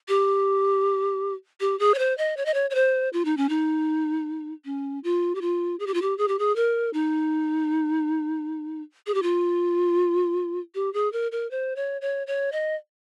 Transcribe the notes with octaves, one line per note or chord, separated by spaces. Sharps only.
G4
G4
G#4
C#5
C5
D#5
C#5
D#5
C#5
C#5
C5
F4
D#4
C#4
D#4
C#4
F4
G4
F4
G#4
G4
F4
G4
G#4
G4
G#4
A#4
D#4
G#4
G4
F4
G4
G#4
A#4
A#4
C5
C#5
C#5
C#5
D#5